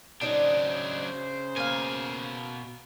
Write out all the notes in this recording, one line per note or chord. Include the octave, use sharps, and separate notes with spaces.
C#3 F#3 D4 D#4 C5 D5 D#5
B2 A#3 F5 G#5